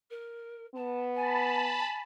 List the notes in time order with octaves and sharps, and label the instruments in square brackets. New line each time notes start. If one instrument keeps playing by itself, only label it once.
[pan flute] A#4
[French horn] B3 [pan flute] A5
[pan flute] G#5 [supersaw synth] A5 B5